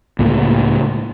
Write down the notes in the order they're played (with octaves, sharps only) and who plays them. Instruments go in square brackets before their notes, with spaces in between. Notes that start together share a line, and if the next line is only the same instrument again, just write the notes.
[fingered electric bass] C#2 A2 A#3